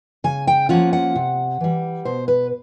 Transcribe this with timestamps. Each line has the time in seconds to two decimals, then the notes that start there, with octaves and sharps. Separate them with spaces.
0.24 C#3 G#5
0.47 G5
0.69 F3 A#3 C#4 F4 F#5
0.93 F#5
1.15 C3
1.61 E3 G3
2.05 B2 C5
2.28 B4